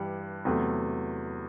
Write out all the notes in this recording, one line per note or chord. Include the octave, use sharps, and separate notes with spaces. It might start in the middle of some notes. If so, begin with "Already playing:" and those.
Already playing: G2 E3 G3
E2 C3 F#3 A3